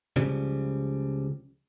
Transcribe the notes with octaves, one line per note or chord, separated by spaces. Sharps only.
C#2 C#3 F3 G3